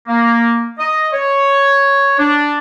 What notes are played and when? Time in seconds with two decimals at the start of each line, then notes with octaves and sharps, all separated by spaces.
0.09 A#3
0.79 D#5
1.13 C#5
2.19 D4